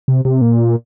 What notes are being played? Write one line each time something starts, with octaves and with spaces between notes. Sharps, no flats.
C3
C3
A#2